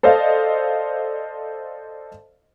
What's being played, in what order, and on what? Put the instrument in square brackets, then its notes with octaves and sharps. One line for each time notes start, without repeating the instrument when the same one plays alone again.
[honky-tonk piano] A4 C5 D5 D#5 F5